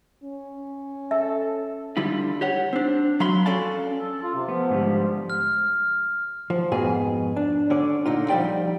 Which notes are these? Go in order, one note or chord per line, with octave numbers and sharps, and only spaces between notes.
C#4
A4 E5
D3 G3 E4 F4
G4 C#5 F#5
C4 D4
F#3 F5 B5 C6
C#4 A4 D5 F5 A5
A4
F4
C3
F3 B3
G#2 D3 G3
F3
F6
F3
F2 G#2 B2 G#4
D4
D3 C#4 D5
A#2 D3 D#4 F4
F3 G3 D#4 G4 D5 G5